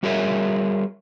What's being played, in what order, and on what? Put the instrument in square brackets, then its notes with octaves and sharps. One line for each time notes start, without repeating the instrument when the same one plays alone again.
[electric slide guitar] G3 F#4 G#4 A#4 C#5 E5